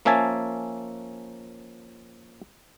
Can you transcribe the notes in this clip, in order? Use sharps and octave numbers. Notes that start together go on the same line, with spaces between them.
F3 A#3 C#4 E5 G#5 A5